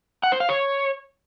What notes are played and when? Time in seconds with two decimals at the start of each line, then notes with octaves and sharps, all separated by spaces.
0.23 F#5
0.32 C5
0.40 F5
0.49 C#5